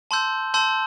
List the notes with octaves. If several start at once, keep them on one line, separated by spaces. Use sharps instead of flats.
A5 C6 E6 G6
A5 C6 E6 G6